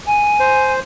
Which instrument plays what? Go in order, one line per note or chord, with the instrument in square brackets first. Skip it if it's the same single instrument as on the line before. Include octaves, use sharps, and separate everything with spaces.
[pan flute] G#5
[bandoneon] C5